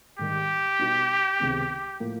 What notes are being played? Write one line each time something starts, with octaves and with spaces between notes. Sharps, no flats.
G#2 D#3 G3 G4
B2 G3 B3 D#4 F#4
C#2 C3 D#3 G#3 B3
A2 F3 A#3